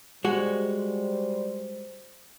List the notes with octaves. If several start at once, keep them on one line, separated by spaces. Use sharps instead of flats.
G3 G#3 F#4 C5